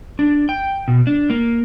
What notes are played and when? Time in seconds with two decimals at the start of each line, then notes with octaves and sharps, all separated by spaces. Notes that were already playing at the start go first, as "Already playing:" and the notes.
0.19 D4
0.49 G5
0.88 B2
1.07 D4
1.30 A#3